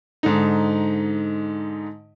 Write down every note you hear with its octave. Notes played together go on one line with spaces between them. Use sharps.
G#2 D3 D#4